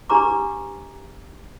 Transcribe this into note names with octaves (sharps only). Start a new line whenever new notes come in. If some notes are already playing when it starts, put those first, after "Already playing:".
D4 G4 B4 A#5 D6